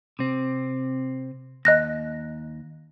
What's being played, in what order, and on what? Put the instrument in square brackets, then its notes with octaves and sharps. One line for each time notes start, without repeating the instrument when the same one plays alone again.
[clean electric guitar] C3 C4
[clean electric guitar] D#2 [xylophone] D#5 F#6 A#6